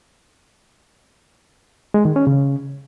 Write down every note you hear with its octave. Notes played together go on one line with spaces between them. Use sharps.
G#3
D#3
C#4
C#3